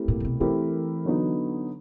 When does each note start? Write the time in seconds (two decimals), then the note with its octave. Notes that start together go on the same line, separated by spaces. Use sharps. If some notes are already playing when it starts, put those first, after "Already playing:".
Already playing: A3 C4 E4 G4 A#4
0.08 A#2
0.20 A#2
0.25 B2
0.40 E3 A3 C4 E4 G4 A#4
1.05 D3 F#3 B3 D#4